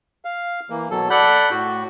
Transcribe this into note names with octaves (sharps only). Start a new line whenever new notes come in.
F5
E3 A#3
B2 F#3 A4
A4 D5 F#5 B5 F#6 G6
A2 F#4